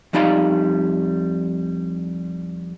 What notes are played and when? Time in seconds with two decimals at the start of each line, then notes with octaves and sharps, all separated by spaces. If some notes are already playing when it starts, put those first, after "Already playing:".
0.13 F2 G3 D#4 D5 F5